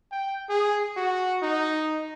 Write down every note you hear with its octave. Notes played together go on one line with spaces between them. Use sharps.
G5
G#4
F#4
D#4